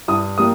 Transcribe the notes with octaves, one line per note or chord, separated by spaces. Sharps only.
G2 D#6
G3 A#3 D#6